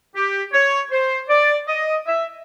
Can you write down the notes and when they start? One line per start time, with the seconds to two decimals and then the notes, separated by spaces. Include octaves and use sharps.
0.15 G4
0.53 C#5
0.92 C5
1.29 D5
1.68 D#5
2.07 E5